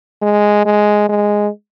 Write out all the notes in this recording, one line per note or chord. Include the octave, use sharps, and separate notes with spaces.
G#3
G#3
G#3